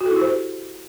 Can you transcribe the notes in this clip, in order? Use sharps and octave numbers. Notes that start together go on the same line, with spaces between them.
F#4
A4
E4
G4
C5